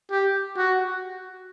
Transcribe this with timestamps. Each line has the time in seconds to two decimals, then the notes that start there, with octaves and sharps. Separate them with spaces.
0.11 G4
0.57 F#4